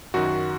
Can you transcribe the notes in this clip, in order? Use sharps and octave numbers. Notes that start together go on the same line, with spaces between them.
F#2 D#3 F#4